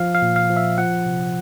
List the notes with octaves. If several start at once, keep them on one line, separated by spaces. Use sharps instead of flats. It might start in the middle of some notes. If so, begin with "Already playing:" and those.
Already playing: F3 F5
F5
A#2
F5
F3
E5
F3 F#5
C3